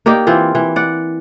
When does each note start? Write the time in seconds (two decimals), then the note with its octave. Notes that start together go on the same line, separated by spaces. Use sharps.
0.06 A#3 D#4 G4 D5
0.27 E3 C4 F4
0.55 E3
0.76 D5 F#5